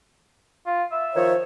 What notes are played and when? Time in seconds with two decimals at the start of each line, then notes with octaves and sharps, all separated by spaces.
0.66 F4
0.92 E5
1.14 D#3 F3 C#5